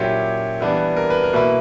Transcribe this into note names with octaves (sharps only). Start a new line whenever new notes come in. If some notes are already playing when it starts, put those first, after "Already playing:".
Already playing: A#2 F#3 C#4 E4 G4
E3 G3 B3 D4
A#4
B4
A#4
B2 A#3 E4 B4